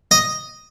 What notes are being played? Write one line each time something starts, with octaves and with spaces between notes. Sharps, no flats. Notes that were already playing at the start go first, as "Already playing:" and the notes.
D#5